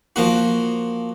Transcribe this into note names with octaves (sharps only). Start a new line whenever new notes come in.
F3 A#3 F#4